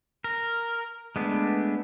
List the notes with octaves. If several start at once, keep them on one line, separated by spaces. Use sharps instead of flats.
A#4
G#3 A3 B3 D4